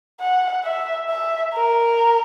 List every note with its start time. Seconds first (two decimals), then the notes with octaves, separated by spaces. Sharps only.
0.20 F#5
0.64 E5
1.09 E5
1.54 A#4